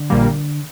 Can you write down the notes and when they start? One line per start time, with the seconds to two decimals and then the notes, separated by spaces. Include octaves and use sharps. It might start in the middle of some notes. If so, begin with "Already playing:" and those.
Already playing: D3
0.10 A#1 A#2 G3 A#3